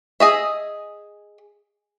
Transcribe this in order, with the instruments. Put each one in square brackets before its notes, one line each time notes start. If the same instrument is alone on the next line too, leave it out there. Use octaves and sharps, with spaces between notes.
[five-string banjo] G#4 D#5 E5